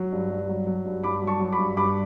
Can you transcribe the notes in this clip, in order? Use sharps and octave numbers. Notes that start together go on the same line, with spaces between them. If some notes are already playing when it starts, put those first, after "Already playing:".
Already playing: F#3
G2
G2
F#3
F#3
G2
G2 B5 D6
F#3
A5 C#6
F#3
B5 D6
G2
G2 B5 D6